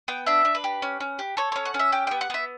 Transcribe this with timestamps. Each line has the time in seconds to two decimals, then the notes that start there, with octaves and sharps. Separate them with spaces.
0.08 B3 G5
0.26 D4 E5
0.45 D4
0.55 B4
0.64 G4
0.82 C#4
1.00 C#4
1.19 G4
1.37 A4 C#5
1.52 C#4 C#5
1.65 F#5
1.74 C#4
1.79 E5
1.92 G4 G5
2.07 B3 G5
2.21 F#5
2.30 B3 E5